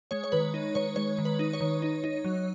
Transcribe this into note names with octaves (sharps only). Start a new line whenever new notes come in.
G#3 C#5
C#5
D#3 B4
D#4
D#3 C#5
G#3 C#5
D#3
B4
D#4
C#5
D#3
D#4
D#4
F#3